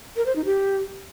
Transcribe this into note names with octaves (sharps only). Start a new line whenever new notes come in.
A#4
C5
D#4
G4